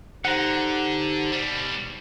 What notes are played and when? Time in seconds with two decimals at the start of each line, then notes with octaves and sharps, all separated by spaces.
0.25 D3 D#4 G4 C5 F#5 A#5
1.32 B2 G3